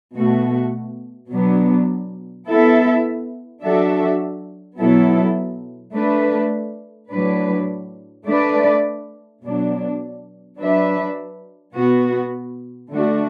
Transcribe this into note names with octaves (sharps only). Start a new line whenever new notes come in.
B2 A3 F#4
B2 F#3 B3 D4
B3 E4 A4 E5
F#3 D4 F#4 A4 E5
B2 F#3 B3 E4 A4
A3 D4 B4
A2 F#3 D4 B4
A3 D4 B4 D5
B2 F#3 D4
F#3 D4 B4 E5
B2 B3 F#4
D3 A3 D4 F#4